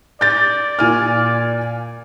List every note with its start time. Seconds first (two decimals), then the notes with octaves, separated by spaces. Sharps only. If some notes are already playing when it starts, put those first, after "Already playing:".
0.21 D5 G6 A6
0.79 A#2 G#5 F6